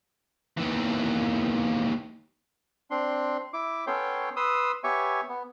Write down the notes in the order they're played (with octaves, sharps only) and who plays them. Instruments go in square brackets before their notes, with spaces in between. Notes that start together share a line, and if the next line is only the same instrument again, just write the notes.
[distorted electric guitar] D#2 E3
[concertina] C4 D4 C6
E4 D6
B3 C#4 A4 C#5 G5 C6
B4 C6 D#6 E6
B3 G4 C#5 E5 G#5 C#6
B3